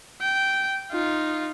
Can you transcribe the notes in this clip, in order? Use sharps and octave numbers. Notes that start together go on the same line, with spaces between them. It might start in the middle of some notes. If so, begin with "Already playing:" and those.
G5
D#4 F4